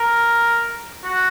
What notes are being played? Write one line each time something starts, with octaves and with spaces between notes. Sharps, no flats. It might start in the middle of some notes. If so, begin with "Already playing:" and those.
Already playing: A#4
F#4